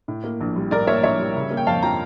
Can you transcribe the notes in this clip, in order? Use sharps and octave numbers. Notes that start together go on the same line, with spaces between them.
A2
A#3
A#1
G3
A2 A#4 D5
A#3 C#5 E5
A#1 C#5 E5
G3
C#3
A#3
G5
F2 F5 A5
F3 G5 A#5